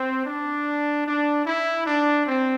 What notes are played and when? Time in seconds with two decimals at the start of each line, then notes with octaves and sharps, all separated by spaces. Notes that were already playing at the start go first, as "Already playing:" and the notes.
Already playing: C4
0.25 D4
1.05 D4
1.45 E4
1.86 D4
2.25 C4